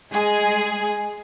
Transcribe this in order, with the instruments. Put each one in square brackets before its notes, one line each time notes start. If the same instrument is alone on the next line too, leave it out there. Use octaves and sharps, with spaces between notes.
[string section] G#3 G#4 G#5